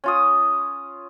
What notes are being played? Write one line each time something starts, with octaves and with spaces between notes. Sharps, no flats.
C#4 F4 D#6